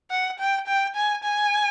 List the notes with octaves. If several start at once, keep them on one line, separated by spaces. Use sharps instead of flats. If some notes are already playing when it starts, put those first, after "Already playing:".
F#5
G5
G5
G#5
G#5